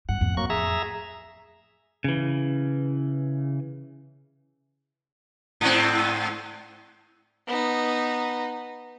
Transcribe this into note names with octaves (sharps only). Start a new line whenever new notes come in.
G2 F#5
F2 A2
F#3 A#3 C#6
G#4 E5 A#5
C#3 E3
G#2 C4
B3 D#4